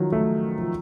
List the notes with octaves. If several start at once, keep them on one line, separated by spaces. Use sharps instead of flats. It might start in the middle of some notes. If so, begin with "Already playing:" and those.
Already playing: D#3 F3 F#3
A3
F3